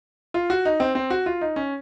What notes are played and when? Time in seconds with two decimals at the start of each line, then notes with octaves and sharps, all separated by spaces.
0.34 F4
0.50 F#4
0.65 D#4
0.80 C4
0.95 C4
1.10 F#4
1.26 F4
1.41 D#4
1.56 C#4